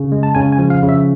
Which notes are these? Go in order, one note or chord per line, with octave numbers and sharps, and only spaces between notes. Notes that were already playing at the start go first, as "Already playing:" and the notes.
Already playing: C#3
G#3
A5
C#3 G#5
G#5
F3
F5
C#3
E5